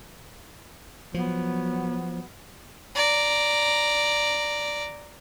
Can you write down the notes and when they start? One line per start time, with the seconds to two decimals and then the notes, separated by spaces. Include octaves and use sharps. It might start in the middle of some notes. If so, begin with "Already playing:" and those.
1.14 F3 F#3 B3
2.95 D5 A#5